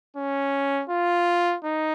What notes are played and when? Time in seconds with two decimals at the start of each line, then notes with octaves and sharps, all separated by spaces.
0.16 C#4
0.89 F4
1.64 D#4